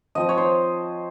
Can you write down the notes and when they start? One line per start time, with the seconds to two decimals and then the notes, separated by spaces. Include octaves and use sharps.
0.15 F3 C4 D#5
0.29 C#5
0.38 C5